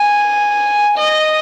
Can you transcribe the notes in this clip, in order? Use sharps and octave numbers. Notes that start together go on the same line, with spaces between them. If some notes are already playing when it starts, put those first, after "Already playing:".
Already playing: G#5
D#5